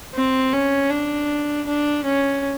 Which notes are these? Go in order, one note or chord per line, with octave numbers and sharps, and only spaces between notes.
C4
C#4
D4
D4
C#4